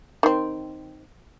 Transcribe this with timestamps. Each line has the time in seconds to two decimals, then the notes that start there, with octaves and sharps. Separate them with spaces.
0.23 D#3 C4